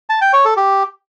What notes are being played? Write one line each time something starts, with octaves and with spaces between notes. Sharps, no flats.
A5
G5
C#5
A4
G4